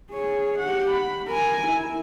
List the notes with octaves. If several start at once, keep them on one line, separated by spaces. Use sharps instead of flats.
G#4 C#5
G4 F#5
B5
A#4 G#5
E4